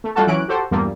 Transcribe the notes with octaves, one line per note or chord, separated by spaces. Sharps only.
A3
G3 A3 F4 F#4 A4
E3 F#3 C#4 F#6 D7
F#4 G4 A4 C5
E2 G2 A#2 F3 G3 A#3